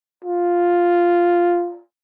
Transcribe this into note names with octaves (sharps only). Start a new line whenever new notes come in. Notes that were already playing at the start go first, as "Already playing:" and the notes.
F4